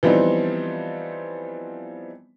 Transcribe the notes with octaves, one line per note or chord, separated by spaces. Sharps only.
E3 F3 G3 B3 C4 D#4